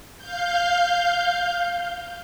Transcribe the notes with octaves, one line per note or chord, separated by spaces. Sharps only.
F5 G6